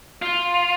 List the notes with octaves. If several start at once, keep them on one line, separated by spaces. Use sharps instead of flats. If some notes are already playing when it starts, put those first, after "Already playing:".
F4